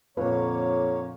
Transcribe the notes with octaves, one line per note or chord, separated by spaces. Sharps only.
F2 A#2 D3 A#3 B4 C#5